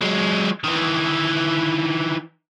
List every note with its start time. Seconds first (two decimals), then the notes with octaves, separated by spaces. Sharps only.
0.02 F#3 G#3
0.64 D#3 E3